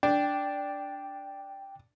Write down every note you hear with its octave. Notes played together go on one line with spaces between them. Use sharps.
D4 G5